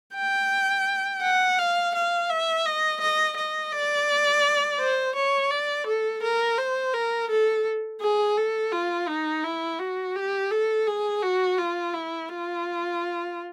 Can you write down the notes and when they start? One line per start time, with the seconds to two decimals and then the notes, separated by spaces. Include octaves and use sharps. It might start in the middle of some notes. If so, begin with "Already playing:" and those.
0.15 G5
1.22 F#5
1.58 F5
1.95 F5
2.30 E5
2.66 D#5
3.01 D#5
3.36 D#5
3.72 D5
4.79 C5
5.15 C#5
5.51 D5
5.87 A4
6.23 A#4
6.58 C5
6.94 A#4
7.30 A4
8.01 G#4
8.37 A4
8.72 F4
9.08 D#4
9.44 E4
9.79 F#4
10.15 G4
10.50 A4
10.87 G#4
11.22 F#4
11.58 F4
11.94 E4
12.29 F4